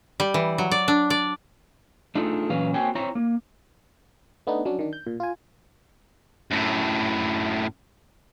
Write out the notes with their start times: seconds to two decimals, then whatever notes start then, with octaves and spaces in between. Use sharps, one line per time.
0.20 G3
0.34 E3
0.58 F#3
0.71 D5
0.88 D4
1.10 D5
2.15 A3 D4 D#4 F4 G#4 A4
2.50 A#2 E3 F#3 C#4 B4 F5
2.74 A#3 C4 F#4 C#5 G5 G#5
2.95 C4 E4 C5 C#5 A#5
3.15 A#3
4.47 A3 B3 D4 D#4
4.65 F#3 C#4 D4
4.79 D#3 D4
4.93 G6
5.07 A#2
5.20 F4 G#5
6.51 F#2 A2